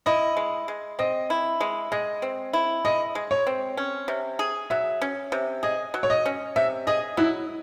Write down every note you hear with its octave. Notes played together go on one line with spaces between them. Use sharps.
E4 D#5
G#3
G#3
C4 D#5
E4
G#3
G#3 D#5
C4
E4
G#3 D#5
G#3
C#5
C4
C#4
C3
G#4
F#3 E5
C#4
C3
G#4 D#5
F#3
C#5
D#5
C#4
C3 E5
G#4 D#5
F#3 E4